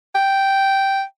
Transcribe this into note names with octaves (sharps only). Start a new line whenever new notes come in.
G5